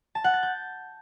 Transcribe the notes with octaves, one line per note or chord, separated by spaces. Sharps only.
A5
F#5
A6
G6